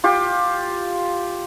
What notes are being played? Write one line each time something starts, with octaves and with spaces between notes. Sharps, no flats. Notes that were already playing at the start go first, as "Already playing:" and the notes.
F4 G4